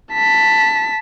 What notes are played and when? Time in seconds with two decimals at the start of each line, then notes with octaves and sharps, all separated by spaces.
0.13 A5 B6